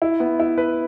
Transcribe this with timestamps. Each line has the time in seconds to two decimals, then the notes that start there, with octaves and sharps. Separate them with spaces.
0.02 E4
0.20 B3
0.40 E4
0.58 B4